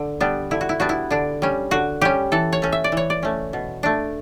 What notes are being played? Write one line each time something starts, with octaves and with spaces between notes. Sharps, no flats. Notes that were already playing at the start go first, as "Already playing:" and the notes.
Already playing: D3
G3 B3 D4
D3 E4
F#4
E4
G3 B3 D4 F#4
E4
D3 D4
G3 C#4
D3 F#4
G3 C#4 G4
E3 A4
C#5
A3 C#4
E5
D5
E3 C#5
D5
A3 C#4
B2
A3 D4